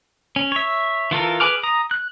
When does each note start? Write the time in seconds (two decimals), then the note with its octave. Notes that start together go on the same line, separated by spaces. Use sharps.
0.36 C#4
0.52 C#5 E5
1.11 E3 F4 A4 A#4
1.40 G#4 B4 G#5 D6 F6
1.63 A#5 D#6
1.91 F#6